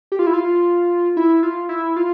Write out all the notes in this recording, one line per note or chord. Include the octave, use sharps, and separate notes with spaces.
G4
F4
E4
F4
E4
F4
E4
F4